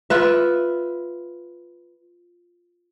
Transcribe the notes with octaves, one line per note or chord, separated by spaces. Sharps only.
F4 B4 E5